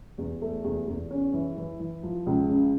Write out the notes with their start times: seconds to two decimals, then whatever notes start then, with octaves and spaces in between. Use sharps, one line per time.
0.18 E2
0.42 A3
0.64 E2
0.88 E2
1.11 C#4
1.33 E3
1.57 E3
1.80 E3
2.03 F3
2.26 C#2
2.49 C#3